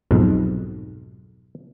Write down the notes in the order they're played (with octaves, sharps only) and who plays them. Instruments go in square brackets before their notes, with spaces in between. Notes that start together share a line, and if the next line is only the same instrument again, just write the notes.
[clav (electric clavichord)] B1 F2 G#2